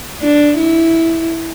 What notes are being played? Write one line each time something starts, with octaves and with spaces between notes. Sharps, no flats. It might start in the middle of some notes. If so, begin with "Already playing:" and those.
D4
E4